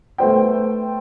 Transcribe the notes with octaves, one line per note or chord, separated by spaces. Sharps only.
A3 B3 C5 G5